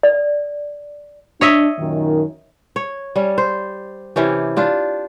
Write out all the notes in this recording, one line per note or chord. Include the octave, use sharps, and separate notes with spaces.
D5
D4 C#5 D#5 E5
F#2 A#2 D#3
C#5
G3 C#4
C5
C3 E3 C#4 G4
D4 F4 G4